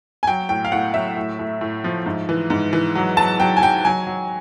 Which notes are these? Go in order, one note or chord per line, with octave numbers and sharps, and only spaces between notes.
G#5
F#3 G5
A2 G5
F5
A2 F#5
F#3 E5
A2
A2
A2
F3
G#2
E3
G#2
E3
F#3
F#3 A5
F#3 G5
G#5
F#3 G5
F#3 G#5
F#3